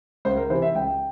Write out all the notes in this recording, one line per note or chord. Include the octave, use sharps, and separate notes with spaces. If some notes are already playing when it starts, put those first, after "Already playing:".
C#2 C5
A#4
C3 E3 C5
E5
C#2 G5